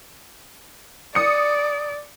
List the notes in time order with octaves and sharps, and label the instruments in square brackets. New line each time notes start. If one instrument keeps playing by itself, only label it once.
[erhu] D5 [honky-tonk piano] D#6 C#7